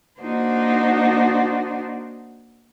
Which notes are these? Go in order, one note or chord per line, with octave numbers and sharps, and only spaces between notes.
A#3 D4 D#4 F#4 C5